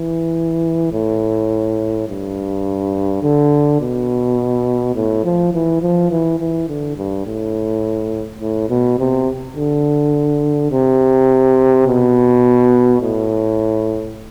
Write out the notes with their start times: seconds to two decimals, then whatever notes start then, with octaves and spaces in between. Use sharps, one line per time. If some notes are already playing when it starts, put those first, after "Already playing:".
Already playing: E3
0.92 A2
2.08 G2
3.23 D3
3.81 B2
4.96 A2
5.24 F3
5.54 E3
5.82 F3
6.11 E3
6.40 E3
6.69 D3
6.97 G2
7.26 A2
8.41 A2
8.69 B2
8.99 C3
9.56 D3
10.71 C3
11.87 B2
13.01 A2